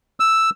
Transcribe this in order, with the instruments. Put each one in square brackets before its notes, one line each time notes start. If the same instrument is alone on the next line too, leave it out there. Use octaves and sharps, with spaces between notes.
[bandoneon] E6